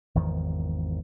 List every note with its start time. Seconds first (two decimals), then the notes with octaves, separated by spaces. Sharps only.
0.15 G#1 E2 D#3 F3